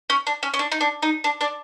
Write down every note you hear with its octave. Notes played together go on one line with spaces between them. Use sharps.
C#4
D4
C#4
C#4
D4
D#4
D4
D#4
D4
D4